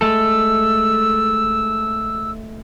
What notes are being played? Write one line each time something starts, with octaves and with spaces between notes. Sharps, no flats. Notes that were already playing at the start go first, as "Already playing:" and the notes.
G#3 A3 A4 E6